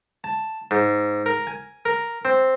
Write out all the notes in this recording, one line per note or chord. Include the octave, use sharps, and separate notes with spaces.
A5
G#2
A#4
G#5
A#4
C4